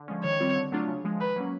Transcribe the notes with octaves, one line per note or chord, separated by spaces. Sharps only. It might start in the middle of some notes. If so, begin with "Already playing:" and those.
Already playing: D3
F3 G#3 C#4
D#3 C#5
G3 C4 F4
D3
F#3 A3 D4 F4
C#3
F3 G#3
D#3 B4
F#3 A#3 C#4